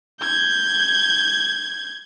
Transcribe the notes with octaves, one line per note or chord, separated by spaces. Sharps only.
G6 G#6